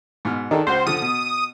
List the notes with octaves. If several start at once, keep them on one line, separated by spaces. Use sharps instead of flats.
G#2 B2 F6
D#3 D4 G#4 A4
C#2 F#4 C5
D3 F3 D#6
B2